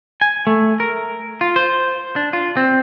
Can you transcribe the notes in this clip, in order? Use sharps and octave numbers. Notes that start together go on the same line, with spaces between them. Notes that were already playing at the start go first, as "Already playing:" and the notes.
G#5
A3
A#4
F4
C5
D4
F4
C4